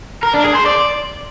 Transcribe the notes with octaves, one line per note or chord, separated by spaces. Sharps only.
A#4
D4
G#4
C5
D5